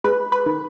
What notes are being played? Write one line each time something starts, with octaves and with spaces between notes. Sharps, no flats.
G#3 B4
B4
D#3